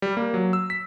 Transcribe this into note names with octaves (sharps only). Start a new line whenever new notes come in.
G3
A#3
F#3
E6
B6